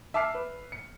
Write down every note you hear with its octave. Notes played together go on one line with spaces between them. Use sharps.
E5 A5 D6 F6 C7
B4
C#7